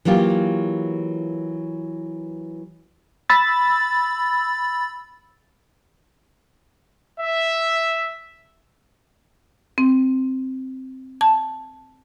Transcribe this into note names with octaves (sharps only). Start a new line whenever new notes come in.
E3 F#3 A#3 F4 G4
B5 E6 A6
E5
C4
A5